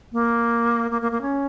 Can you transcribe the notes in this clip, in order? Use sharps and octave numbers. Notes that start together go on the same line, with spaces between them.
A#3
A#3
A#3
A#3
C#4